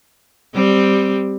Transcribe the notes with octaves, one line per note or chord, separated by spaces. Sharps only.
G3 C4